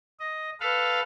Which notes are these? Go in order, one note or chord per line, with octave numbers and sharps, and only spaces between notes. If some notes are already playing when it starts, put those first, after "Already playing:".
D#5
A4 B4 F5